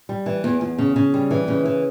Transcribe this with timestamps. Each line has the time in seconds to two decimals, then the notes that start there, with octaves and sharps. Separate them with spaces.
0.09 G3
0.26 E3
0.44 E2
0.61 E2
0.78 C#3
0.96 C#3
1.14 G3
1.31 E3
1.48 C#3
1.65 E3